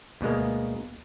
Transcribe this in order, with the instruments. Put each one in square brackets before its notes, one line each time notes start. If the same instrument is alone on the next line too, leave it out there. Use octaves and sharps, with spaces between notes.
[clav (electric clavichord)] D2 B2 G#3 A#3